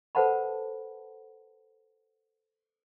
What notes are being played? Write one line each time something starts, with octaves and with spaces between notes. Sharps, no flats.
A4 B4 C5 F#5 A5 B5